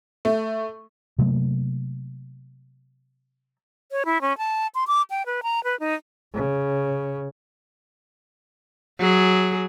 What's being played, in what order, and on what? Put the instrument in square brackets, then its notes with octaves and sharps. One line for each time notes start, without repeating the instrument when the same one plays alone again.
[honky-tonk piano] A3
[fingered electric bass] C3 F#3 A3 A#3
[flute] C#5
E4
C#4
A5
C6
D6
G5
B4
A#5
B4
D#4
[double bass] C#3
[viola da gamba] F#3 G#4